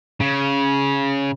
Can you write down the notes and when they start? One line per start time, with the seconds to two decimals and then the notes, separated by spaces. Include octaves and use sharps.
0.20 C#3